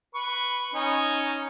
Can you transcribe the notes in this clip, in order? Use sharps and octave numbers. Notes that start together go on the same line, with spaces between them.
B4 C#6
C#4 D#4 C#6